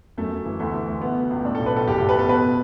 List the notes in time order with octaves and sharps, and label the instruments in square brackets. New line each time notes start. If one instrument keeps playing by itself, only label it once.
[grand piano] F#2 A3
F#2
E3
D2 A3
E3
D2
B2 B3
B2
C#2
A2 D4
A4
B1
B4
A2 A4
F#1 G4
A4
F#1
B4
E2 A4
B2 B4